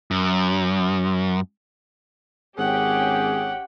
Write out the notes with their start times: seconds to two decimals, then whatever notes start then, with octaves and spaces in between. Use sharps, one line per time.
0.11 F#2
2.58 G#1 C#4 G4 G#4 F#5 G5